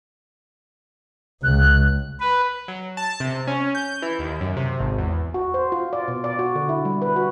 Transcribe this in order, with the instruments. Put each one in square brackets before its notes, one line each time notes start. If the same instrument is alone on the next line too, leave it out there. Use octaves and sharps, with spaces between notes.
[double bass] C#2 [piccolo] F#6
[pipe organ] B4
[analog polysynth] F#3
A5
C3
C#4
G6
E3
D#2
F#2
C3
G#1
E2
[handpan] F#4
C5
F4
D5
B2
D5
F#4
D3
E4
G3
B4
F#4